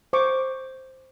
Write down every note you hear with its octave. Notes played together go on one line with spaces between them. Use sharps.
C5 C#6 D6